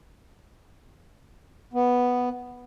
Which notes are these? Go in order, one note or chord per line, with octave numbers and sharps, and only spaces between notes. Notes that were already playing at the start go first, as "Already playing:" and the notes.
B3